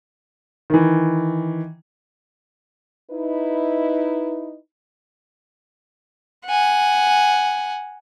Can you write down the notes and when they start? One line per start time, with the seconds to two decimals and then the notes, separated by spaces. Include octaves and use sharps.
0.70 D#3 E3
3.11 D#4 E4 B4
6.46 F#5 G#5